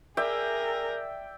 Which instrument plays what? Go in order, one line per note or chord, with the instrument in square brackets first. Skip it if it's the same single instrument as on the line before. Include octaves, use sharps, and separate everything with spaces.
[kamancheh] G#4 A#4 [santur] D5 E5 G5